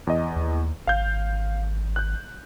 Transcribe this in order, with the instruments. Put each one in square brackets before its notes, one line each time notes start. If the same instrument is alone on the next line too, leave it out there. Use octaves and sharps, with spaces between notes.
[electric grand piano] E2 D#5
[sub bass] D#2
[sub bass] G#1 [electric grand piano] F5 G6
[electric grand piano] F#6 G6